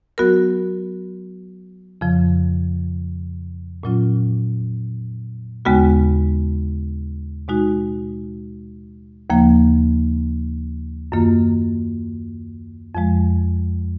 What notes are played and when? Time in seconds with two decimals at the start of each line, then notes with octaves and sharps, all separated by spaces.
0.18 F#3 B3 F#4 A#4
2.01 F2 C#3 F3
3.83 A#2 F#3 C#4 F4
5.65 D#2 C#3 G#3 B3 F#4
7.48 B2 G#3 D#4 F#4
9.30 D#2 C#3 F3 A#3
11.12 F#2 D#3 A#3 F4
12.95 F2 F3 G#3